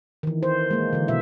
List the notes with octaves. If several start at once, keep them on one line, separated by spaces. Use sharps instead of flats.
D#3 E3
C5
G#3 A#3
D3 E3
B2 E5